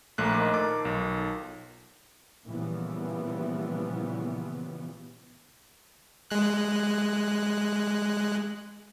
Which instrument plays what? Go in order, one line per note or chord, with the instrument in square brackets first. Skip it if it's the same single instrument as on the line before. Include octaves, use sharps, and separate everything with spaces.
[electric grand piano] A#1 A3 F#6 [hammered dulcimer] A#3 C6
[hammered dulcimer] D#3 F3 A#3
[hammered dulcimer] A4 [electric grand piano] D6
[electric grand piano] B1
[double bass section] A#2 C#3 E3 F3 G3 B3
[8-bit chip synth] G#3 F#6